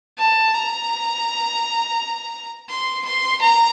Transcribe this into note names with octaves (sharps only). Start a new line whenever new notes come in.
A5
A#5
C6
C6
A#5